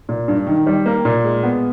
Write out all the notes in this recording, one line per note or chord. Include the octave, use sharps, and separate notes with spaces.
A#2
G2
D#3
G3
A#3
A#2
G#3
B3